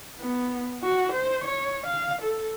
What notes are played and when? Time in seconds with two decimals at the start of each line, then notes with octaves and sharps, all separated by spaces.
0.20 B3
0.83 F#4
1.12 C5
1.44 C#5
1.87 F5
2.22 A4